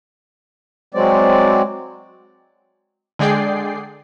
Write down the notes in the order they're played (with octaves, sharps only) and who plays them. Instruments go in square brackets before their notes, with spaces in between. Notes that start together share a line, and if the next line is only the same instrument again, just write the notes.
[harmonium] F#3 G#3 C4 D5
[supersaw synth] D3 G#3 G#4 D5 G5 C7